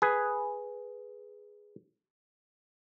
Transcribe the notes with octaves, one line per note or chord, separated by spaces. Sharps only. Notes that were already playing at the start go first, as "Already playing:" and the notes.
G#4 B4